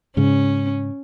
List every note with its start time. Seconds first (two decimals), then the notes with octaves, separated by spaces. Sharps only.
0.17 G#2 C#3 C#4